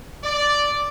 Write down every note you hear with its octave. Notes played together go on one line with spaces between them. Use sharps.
D5